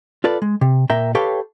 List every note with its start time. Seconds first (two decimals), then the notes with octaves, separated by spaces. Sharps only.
0.24 F4 A4 B4 D5
0.42 G#3
0.61 C3
0.90 A#2 A#4 E5 G5 A#5
1.15 G4 A4 B4 C#5 F5 G5